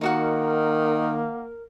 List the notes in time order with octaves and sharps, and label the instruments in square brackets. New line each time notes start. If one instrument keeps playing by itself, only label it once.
[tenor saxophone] D#3 [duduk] A#3 [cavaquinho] D#4 F#4 F#5 [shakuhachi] A#4